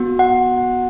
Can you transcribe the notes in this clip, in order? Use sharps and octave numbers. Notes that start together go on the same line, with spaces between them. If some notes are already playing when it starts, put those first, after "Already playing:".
Already playing: B3 F#4
F#5